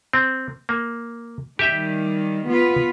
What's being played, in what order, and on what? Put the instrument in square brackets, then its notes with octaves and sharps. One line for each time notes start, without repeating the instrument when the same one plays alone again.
[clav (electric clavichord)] C4
A#3
[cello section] D#3 G3 [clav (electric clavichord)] G4 E5 G5
[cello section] B3 F4 B4